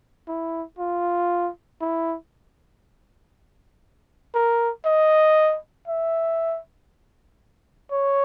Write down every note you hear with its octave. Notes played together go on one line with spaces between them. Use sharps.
E4
F4
E4
A#4
D#5
E5
C#5